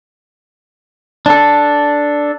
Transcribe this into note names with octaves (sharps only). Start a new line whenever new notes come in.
D4 A4